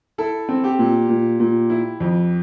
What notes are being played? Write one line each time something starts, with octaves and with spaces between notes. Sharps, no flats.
E4 A4
C4
G4
A#2
A#2
A#2
E4
F2